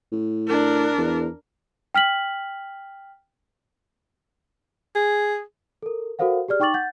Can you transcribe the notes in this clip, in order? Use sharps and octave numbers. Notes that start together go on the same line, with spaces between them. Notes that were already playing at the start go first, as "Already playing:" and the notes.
A2
D4 A#4
E2
G5 F6 B6 F#7
G#4
A4 A#4
F#4 A4 A#4 C5 F5 F#5
G4 G#4 D5 F6
D#4 G5 C#6 D6 A6 F#7
F#5 G6 A6